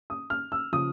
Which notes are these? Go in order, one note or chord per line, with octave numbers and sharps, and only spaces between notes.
D#6
F6
E6
C#3 F3 D#6